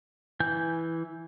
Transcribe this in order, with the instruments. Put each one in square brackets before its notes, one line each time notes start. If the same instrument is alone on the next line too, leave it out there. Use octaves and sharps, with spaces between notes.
[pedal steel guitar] E3 G#5 G6